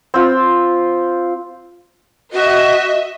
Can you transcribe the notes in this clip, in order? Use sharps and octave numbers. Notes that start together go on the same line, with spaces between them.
C4 F4
F#4 D#5 E5